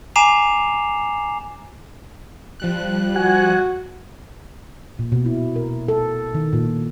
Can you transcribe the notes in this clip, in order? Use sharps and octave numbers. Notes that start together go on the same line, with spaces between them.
G#5 A#5 D6 C7 E7 F7
F3 G3 F#6
F#4 F#5 G#5
A#2
B2
E4
A#4
A4
D#3
A#2